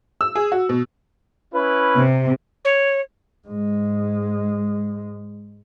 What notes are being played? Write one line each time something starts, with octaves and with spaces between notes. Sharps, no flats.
E6
G#4
F#4
B2
C#4 E4 B4
C3
C#5
G#2 G#3